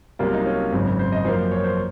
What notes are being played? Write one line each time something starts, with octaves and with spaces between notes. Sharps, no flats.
C2 C3 F#3 A#3 F4
D#4
C#4
G#1 F#2 C#3 C4
C#4
C5
D#5
F#2 F3 A#3 C5
C#5
C5